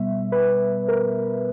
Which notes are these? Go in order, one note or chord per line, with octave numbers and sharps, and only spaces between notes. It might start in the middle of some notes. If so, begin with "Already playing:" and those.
Already playing: B2 G3 B3 E5
B4
A#4